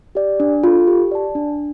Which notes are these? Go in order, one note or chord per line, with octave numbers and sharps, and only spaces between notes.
G4 D5
D4
F4 A4
G4
D5 A5
D4